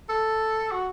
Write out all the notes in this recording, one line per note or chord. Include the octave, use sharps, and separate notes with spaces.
A4
F#4